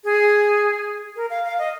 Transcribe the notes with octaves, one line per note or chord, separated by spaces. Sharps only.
G#4
A#4
F5
F5
D#5